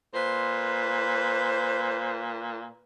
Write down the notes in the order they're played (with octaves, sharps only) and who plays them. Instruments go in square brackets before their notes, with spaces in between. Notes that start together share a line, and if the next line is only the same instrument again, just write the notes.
[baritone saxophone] A#2 [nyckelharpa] B4 [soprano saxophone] C5